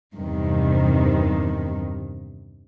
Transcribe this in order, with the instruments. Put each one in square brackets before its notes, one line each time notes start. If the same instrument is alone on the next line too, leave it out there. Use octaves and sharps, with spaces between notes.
[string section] E2 G2 C3 D#3